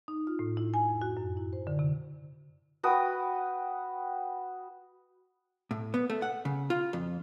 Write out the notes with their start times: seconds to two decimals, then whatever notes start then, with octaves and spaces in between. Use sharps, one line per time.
0.08 D#4
0.27 F4
0.39 A2
0.57 E4
0.74 G#5
0.88 F2
1.01 F#4
1.17 F#2
1.37 E4
1.53 C5
1.67 D3
1.79 C3
2.83 F#4 B4 G5 D#6
5.71 A2
5.94 B3
6.10 A3
6.22 F#5
6.45 C#3
6.70 F4
6.93 F2